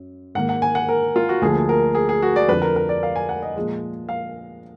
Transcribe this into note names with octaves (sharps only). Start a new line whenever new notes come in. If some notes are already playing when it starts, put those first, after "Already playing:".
Already playing: F#2
G#2 D#3 A#3 F#5
F#5
G#5
F#5
A#4
F4
F#4
D2 D3 F3 A#3 G#4
A#4
G#4
G#4
F#4
D5
F2 D3 F3 B4
A#4
A#4
D5
F5
G#5
F#5
D#5
A#2 F3 G#3
F5